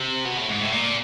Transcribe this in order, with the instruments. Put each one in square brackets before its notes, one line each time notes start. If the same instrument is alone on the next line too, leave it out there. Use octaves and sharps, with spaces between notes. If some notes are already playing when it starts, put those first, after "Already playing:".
Already playing: [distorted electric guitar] C3
B2
A2
G#2
A2
A#2